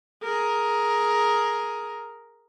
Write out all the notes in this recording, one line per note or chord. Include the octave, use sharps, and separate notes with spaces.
G#4 A#4